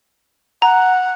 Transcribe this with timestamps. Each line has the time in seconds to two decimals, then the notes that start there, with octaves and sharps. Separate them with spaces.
0.62 F#5 A#5